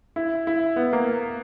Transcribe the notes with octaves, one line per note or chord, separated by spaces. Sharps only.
E4
E4
B3
A#3